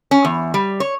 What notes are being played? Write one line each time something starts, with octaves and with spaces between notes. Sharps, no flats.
C#4
E2
G3
C#5